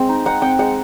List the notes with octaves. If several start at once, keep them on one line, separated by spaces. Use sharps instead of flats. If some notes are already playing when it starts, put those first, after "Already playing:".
Already playing: G#3 C4
D#4
D#4 F#5
C4 G5
G#3 F#5